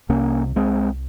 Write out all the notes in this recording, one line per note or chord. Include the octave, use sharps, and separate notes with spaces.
C2 C3 A#3 C#4
G#3 C4